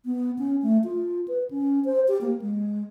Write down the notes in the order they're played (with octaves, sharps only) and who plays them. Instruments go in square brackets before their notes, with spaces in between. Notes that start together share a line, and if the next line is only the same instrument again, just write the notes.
[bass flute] B3
C#4
A3
F4
B4
C#4
C5
G4
A#3
G#3